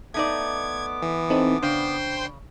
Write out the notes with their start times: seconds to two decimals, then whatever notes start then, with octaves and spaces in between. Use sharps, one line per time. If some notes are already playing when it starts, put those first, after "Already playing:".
0.14 A3 B3 D#4 D5 D6 G#6
1.02 E3
1.30 C4 D#4 A4 C5
1.63 C#3 D4 C5 G5 C6